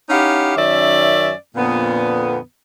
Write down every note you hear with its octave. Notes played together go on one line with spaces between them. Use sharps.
C#4 D#4 E4 G4 F5 F#5
F#2 D#3 C#4 D5 E5
F2 A#2 D3 B3